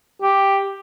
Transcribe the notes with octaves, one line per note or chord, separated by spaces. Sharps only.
G4